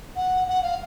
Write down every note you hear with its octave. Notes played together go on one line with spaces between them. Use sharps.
F#5
F#5
F5